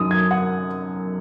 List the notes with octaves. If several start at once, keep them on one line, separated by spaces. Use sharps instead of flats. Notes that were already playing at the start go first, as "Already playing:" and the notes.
Already playing: F#2 D#3 F#3 D#6
G#6
F#5